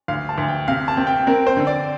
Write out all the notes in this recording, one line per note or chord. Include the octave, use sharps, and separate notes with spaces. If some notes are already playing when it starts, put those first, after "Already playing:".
D2 F5
A5
D2
G5
C3 F5
A5
C4
G5
C4 A#4
C5
D3
D5